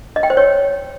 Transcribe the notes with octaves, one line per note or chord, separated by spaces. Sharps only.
D#5
G5
C5
C#5